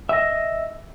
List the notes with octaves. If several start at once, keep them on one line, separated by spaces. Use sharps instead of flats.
D#5 E5